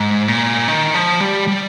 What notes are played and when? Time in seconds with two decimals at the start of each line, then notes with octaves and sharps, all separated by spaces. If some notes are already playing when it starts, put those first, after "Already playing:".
Already playing: G#2
0.28 A#2
0.68 D#3
0.94 F3
1.20 G3
1.47 G3